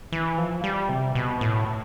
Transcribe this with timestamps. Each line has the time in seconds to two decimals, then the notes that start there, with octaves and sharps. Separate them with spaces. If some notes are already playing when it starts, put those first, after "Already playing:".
0.12 E3
0.38 F3
0.64 G3
0.89 C3
1.15 B2
1.41 A2